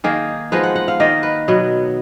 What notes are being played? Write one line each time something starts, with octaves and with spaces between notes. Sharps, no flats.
D#3 A#3 D#4 G#4
F3 G#3 B3 D#4 B4
F#5
F#5
F5
D#3 A#3 D#4 D#5
B4
B2 F#3 B3